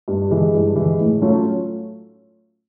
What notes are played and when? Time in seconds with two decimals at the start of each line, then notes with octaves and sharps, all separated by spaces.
0.08 G2
0.31 E3 G#3
0.54 G2
0.76 E3 G#3
0.99 A2
1.21 F#3 A3 C#4 F4